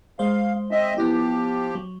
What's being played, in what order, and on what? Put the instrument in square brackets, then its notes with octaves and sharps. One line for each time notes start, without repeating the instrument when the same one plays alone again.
[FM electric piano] G#3 C5 [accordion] F5
[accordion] C4 D#5 E5
[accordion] F3 G4 [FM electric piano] B3 E4
[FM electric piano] F#3